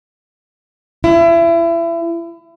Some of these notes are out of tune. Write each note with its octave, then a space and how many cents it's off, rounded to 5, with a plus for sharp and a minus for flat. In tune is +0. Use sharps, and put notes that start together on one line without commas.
E4 +30